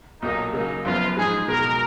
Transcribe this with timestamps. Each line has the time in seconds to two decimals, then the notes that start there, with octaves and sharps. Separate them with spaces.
0.22 B1 A#2 F#3 A#3 D#4
0.53 C#3 F#3 A#3 D#4
0.85 F#1 F#2 F3 B3 F4
1.16 G#2 F3 G#3 D#4 G#4
1.48 C#2 B2 G#3 A#4